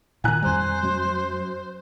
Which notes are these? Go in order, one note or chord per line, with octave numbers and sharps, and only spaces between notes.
A#2 D#3 G#5 A#5 F#6
F2 G3 C5
F#2